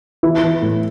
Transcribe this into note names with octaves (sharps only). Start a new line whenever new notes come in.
E3 E4
E3
A2